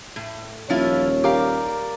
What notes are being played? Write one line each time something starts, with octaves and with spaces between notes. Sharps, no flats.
A2
D#1 F3 E4 F4 C#5
G4 A#4 D5 F5